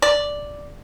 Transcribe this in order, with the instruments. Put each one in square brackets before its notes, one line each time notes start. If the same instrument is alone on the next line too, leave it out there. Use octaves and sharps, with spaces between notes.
[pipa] D5